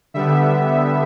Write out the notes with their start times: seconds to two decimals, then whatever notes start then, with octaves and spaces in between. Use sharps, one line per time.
0.14 D3 G3 B3 E5